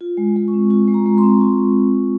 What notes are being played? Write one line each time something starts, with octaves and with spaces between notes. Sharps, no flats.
F4
G#3
G#3
C#6
C4
F4 C#6
G#3
A#5
G#3
C6
C4
F4 C#6